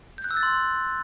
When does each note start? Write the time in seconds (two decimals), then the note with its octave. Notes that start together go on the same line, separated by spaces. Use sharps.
0.18 G6
0.24 F#6
0.31 E6
0.37 A6
0.43 C6